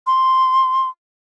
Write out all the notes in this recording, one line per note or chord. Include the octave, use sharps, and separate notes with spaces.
C6